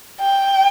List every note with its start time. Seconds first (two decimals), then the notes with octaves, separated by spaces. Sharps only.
0.20 G5